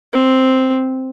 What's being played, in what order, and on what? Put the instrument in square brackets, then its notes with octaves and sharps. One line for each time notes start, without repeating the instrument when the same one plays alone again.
[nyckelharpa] C4